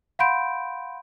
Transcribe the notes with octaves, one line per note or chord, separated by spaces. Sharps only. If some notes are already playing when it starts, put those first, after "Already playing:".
F5 F#5 B5 C6 G6 D7